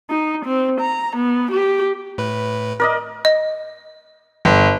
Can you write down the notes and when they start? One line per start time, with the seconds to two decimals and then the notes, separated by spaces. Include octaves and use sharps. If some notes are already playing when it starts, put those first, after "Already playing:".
0.10 D#4
0.45 C4
0.81 A#5
1.16 B3
1.51 G4
2.18 A2 B4
2.80 A#4 D5 D#5
3.25 D#5
4.45 G1